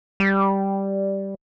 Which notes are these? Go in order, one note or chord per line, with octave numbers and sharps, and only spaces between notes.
G3